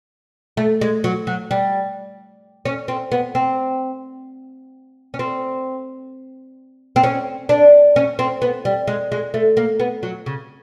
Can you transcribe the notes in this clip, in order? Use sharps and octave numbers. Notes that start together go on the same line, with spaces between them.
A3
G#3
F#3
F#3
G3
C#4
C4
B3
C4
C#4
C4
C4
C#4
D4
C#4
C4
B3
G3
G#3
G#3
A3
A#3
B3
F#3
C#3